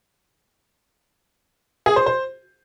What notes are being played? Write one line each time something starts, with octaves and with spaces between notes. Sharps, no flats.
G#4
C5
C5